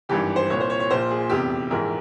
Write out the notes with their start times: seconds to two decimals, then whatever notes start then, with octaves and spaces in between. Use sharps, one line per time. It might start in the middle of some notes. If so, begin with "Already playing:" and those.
0.09 G#1 G2 E3 G4
0.36 C5
0.50 C2 A#2 C#5
0.60 C5
0.70 C#5
0.80 C#5
0.90 A#1 A#2 C5
1.11 G#4
1.29 F1 E2 C3 G4
1.70 A#1 G#2 E3 A#4